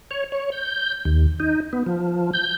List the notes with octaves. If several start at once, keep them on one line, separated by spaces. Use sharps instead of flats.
C#5
C#5
G6
D#2
D#4
B3
F3
G6